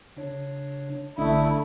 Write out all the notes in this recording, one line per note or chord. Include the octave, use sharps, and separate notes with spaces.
C#3 D4 C#5
A#1 D3 A3 E4 D#6